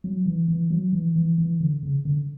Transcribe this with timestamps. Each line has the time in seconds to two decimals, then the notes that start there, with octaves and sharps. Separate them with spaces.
0.04 F#3
0.26 E3
0.48 E3
0.71 F#3
0.93 E3
1.16 E3
1.38 E3
1.61 D3
1.83 C#3
2.05 D3